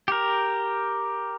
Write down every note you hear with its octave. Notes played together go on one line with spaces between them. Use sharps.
G4 A#4